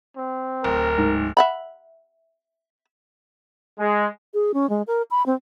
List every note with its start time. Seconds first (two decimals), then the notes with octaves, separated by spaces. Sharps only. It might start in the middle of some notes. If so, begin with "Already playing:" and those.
0.17 C4
0.64 D1 A#4
0.98 G#2
1.37 E5 F#5 B5
3.79 G#3
4.34 G#4
4.54 C#4
4.69 G#3
4.87 A#4
5.11 B5
5.26 C4